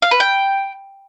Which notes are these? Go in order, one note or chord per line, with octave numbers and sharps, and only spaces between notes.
F5
B4
G5